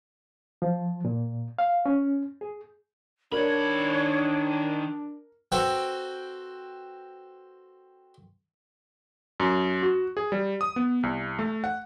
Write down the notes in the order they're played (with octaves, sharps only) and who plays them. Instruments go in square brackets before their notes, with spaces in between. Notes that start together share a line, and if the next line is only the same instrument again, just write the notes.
[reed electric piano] F3
A#2
F5
C#4
G#4
[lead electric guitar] D#3 B5 [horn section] D4 [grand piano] A#4 [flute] C#5
[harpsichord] C4 F#4 A4 B4 G5
[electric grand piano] F#2
F#4
G#4
G3
D#6
B3
C2
A3
F#5